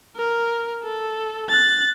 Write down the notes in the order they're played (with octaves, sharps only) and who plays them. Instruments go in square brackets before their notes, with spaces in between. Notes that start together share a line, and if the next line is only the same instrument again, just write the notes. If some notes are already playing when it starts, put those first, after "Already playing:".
[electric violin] A#4
A4
F#6 A6